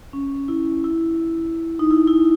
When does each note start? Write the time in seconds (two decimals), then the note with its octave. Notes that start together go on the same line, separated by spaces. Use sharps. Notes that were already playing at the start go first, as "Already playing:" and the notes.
0.13 C#4
0.48 E4
0.84 E4
1.79 D#4
1.91 E4
2.08 E4